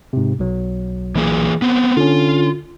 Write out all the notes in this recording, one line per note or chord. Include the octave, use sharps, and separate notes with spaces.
G#2 C3
B1 F#3
E3 A#3 G#4
B3 C4
D3 C#4 F4